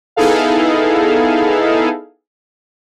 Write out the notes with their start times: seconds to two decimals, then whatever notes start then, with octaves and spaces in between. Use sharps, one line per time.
0.16 B3 D#4 E4 G#4 A4 F5